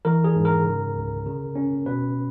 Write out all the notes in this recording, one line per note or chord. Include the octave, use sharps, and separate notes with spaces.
E3 A#4
G#4
G#2
A#4
C#3
C#2
C#3
C#4
B2 B4